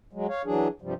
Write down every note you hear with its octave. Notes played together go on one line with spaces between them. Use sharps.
F#3 G#3
C#5 F5
E3 F#3 D4 G#4
G2 C3 F3 G3